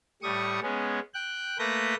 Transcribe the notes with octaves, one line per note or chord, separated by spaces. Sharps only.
A2 G3 C#6 D#6
G#3 B3 C#4
G5 F#6
A3 A#3 B4 G6 A#6